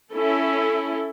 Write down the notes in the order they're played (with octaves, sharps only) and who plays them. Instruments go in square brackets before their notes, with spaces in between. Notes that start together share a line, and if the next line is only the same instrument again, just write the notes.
[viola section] C#4 E4 A4